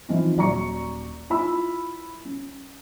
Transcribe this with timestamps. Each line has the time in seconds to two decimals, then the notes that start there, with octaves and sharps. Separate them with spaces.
0.09 E3 F3 C4 D#4 F4
0.36 D#1 F#3 D5 A#5 C#6 C#7
1.30 E4 F4 B5 E6
2.25 C#4